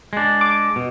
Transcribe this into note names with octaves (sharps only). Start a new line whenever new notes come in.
G#3 D4
D6
B2